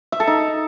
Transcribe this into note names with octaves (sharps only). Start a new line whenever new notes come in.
E5
A4
D#4